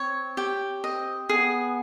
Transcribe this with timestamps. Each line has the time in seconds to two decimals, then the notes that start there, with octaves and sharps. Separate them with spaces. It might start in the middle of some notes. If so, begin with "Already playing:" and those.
Already playing: C4 C#5
0.37 G4
0.84 C4 D#5
1.29 B3 G#4